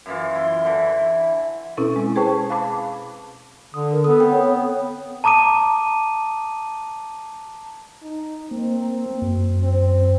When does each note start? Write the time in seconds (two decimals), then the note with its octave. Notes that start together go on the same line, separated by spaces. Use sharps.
0.06 F#2 E3 F4
0.34 E4 C6
0.65 D3 E3
1.77 B2 C4 C#4 E4 A4
1.96 G#3
2.16 G#4 B4 C5 G5 A5 C#6
2.50 F5 A5 B5 D6
3.74 D3 D#6
3.92 A#4
4.04 B3 A4 D#6
4.20 C4 G5
4.32 B3 C#5
5.24 A5 A#5 D6 D#6 D#7
8.02 D#4
8.51 A#3 C4
9.22 F#2
9.63 C4